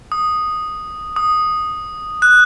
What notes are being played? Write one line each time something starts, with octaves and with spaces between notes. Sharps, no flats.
D#6
D#6
F#6